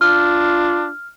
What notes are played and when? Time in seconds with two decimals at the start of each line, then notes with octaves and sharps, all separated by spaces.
0.01 D4 F4 F6